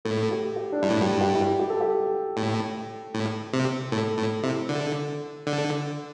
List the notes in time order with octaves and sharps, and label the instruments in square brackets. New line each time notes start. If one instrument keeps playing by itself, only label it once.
[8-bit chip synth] A2 [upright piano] A4
[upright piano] G4
G4
D4
[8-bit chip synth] G2 [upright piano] E4
[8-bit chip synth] A2
[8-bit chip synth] G2 [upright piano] G4
[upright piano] G4
E4
G4
G4
A4
G4
[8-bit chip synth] A2
A2
C3
[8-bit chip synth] A2 [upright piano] A4
[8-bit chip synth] A2
[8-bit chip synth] C3 [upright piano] E4
[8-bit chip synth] D3 [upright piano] A4
[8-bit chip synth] D3